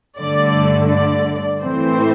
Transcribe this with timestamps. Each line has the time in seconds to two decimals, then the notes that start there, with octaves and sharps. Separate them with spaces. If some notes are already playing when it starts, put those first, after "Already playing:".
0.19 G2 D3 A3 D5
0.91 D5
1.62 A2 E3 A3 C4 C5